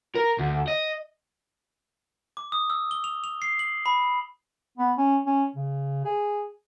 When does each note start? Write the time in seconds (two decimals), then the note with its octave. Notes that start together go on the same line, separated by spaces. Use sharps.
0.15 A#4
0.39 D2
0.68 D#5
2.37 D6
2.52 D#6
2.70 E6
2.91 G7
3.04 F7
3.24 F7
3.42 C7
3.59 F#7
3.86 B5
4.78 B3
4.97 C#4
5.26 C#4
5.55 C#3
6.05 G#4